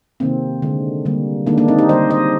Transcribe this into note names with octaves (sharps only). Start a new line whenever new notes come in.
C3 D#3 A#3 C4
D3 G#3
D3 G3 A#3
D#3 G#3 A#3 D4
A#3 D4
C4 D#4
D#4 G4
D3 G3 A#3 C5 D#5
C5 D#5